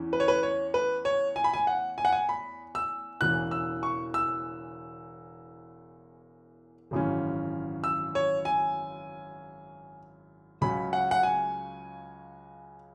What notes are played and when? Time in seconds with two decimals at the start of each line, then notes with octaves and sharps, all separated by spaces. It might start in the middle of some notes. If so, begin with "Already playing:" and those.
Already playing: E2 E3 C#4
0.13 B4
0.20 C#5
0.28 B4
0.43 C#5
0.74 B4
1.05 C#5
1.36 G#5
1.44 B5
1.54 G#5
1.67 F#5
1.98 G#5
2.05 F#5
2.12 G#5
2.29 B5
2.75 E6
3.21 E1 E2 C#3 E3 F#6
3.51 E6
3.83 C#6
4.14 E6
6.91 G#1 F#2 C#3 E3 C#4
7.84 E6
8.15 C#5
8.45 G#5
10.61 C#2 C#3 F#3 C#4 B5
10.93 F#5
11.11 F#5
11.23 G#5